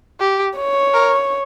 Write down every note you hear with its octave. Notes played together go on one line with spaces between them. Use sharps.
G4
C#5
A#4